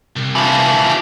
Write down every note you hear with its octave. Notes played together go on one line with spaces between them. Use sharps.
C2
E3 F3
G4